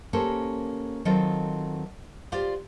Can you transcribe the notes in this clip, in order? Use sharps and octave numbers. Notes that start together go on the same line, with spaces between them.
A#3 C#4 G4 A4 A#4 C5
D#3 F#3 C4 F4 A4 C5
F4 G4 C5 D5 F5